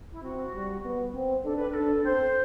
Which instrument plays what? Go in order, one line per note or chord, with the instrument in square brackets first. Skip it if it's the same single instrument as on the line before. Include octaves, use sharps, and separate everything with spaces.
[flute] E4
[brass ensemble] C4 [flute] F#4
[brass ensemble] G3
B3
C4
[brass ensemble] D4 [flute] A4
[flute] B4
B4
[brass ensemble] D4 [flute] A4
[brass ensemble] C4 [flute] C5